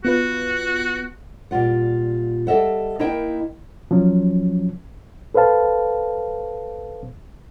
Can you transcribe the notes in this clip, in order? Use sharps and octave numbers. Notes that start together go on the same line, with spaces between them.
B3 F4 F#4 B4
A#2 G3 F4 F#5
G3 A4 D#5 E5 F#5
A#3 D#4 E4 A#4 D#5 G5
F3 F#3 C#4
A4 B4 C5 F5 A5